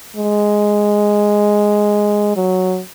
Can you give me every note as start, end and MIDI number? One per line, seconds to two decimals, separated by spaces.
0.16 2.35 56
2.36 2.80 54